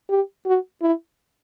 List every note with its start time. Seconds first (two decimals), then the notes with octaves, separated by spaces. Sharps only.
0.09 G4
0.46 F#4
0.82 E4